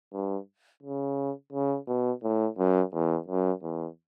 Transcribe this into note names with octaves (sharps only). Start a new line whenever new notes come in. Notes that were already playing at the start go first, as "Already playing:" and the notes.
G2
C#3
C#3
B2
A2
F#2
E2
F#2
E2